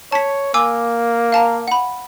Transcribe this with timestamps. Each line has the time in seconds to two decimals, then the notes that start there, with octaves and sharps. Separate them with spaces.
0.12 C#5 A5 B6
0.54 A#3 G#5 D6 E6
1.32 F5 A5 A#5
1.68 F#5 B5